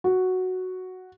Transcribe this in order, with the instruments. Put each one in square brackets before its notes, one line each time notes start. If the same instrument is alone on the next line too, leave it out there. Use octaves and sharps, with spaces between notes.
[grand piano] F#4